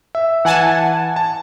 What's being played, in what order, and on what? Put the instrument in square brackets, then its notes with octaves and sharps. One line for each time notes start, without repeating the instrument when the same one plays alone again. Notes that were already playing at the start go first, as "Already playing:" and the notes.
[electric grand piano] E5
[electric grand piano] E3 [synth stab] F#5 G#5 A5
[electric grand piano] A5